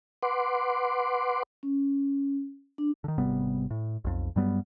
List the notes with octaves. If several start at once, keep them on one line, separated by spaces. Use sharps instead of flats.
B4 F#5 C6 D6
C#4
D4
D3 D#3
G#1 C3 G3 B3
A2
B1 F2
G2 F#3 G3 B3